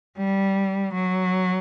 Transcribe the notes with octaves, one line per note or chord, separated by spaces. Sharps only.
G3
F#3